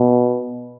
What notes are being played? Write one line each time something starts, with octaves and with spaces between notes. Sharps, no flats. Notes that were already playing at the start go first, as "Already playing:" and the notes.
Already playing: B2